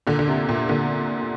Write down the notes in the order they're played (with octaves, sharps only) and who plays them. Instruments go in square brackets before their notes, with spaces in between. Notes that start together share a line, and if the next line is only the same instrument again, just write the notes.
[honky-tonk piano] A#2 D3
D3
C3
A#2
A#2 D3